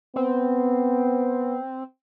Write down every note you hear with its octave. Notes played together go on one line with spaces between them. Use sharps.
B3 C4